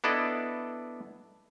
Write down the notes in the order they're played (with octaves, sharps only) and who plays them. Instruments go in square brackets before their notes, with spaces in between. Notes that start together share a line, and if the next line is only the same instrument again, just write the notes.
[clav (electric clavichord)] B3 D4 E4 A4 D5 D#5